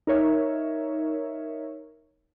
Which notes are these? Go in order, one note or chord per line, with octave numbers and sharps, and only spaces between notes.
D#4 A#4 C#5 E5